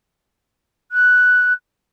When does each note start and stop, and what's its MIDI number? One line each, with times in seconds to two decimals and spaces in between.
0.91 1.53 90